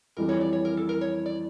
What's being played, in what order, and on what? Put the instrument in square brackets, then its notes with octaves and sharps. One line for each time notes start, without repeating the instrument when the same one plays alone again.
[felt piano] F2 E3 G3 [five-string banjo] A#4
[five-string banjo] C#5
D5
C#5
A#4
A4
A#4
C#5
D5